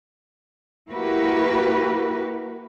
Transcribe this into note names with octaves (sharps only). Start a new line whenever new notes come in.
A#3 E4 F#4 G4 A#4 B4